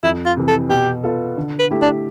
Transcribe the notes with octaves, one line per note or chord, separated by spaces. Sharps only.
F2 E4
F4
C3 E3
A4
B2 G4
B3 F4 A4
D3
B4
A3 E4 G4
D4